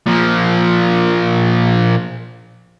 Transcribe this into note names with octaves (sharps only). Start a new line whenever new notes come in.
A#2 F3